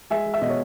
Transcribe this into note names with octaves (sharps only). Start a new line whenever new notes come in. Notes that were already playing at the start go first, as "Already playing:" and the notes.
G#3 E5 G#5
G#3
E5
B2 D#5
C#5